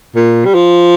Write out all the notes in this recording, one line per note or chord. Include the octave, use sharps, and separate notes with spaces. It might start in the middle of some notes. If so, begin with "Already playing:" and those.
A#2
G3
F3